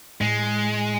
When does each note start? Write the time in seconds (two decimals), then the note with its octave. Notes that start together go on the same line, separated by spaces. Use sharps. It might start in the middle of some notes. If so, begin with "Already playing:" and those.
0.21 A2 G#3